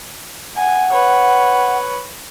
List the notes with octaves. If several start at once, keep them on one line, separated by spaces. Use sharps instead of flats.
F#5 G#5
B4 C#5